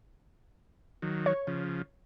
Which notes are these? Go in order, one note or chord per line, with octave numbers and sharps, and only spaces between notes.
D#3 F#3
C#5
C#3 F3